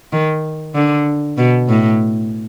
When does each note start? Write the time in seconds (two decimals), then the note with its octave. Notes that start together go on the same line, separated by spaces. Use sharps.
0.13 D#3
0.75 D3
1.38 B2
1.69 A2